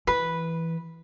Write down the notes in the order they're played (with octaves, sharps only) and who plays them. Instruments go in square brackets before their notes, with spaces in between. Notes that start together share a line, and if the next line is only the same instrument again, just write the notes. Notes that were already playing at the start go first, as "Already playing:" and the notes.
[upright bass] E3 [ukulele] B4